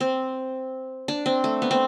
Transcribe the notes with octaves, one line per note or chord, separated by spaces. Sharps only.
C4
D4
C4
A3
B3
C4